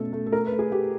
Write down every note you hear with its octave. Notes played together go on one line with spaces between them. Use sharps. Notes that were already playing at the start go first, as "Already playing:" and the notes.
Already playing: B2 A3 C#4 A4
A3
A4
A3 A#4
B4
A3
G#4
A3 G4